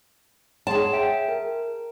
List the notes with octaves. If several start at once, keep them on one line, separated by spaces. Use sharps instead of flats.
G#4 C#5 F#5 A5 C6
E5 G5 D7
A#4